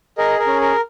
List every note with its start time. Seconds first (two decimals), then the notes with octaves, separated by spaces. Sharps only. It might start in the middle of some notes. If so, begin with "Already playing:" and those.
0.18 G#4 A#4 D#5
0.39 A#4
0.47 C#4
0.61 A#4